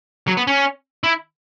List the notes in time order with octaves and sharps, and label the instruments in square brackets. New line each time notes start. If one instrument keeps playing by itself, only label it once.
[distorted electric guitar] F#3
B3
C#4
E4